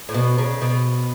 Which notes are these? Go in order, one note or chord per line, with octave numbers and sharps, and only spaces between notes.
A2
B2
C#3
B2